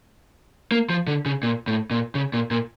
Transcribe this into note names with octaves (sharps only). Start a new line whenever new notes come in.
A#3
F3
D3
C#3
A#2
A2
A#2
C#3
A#2
A#2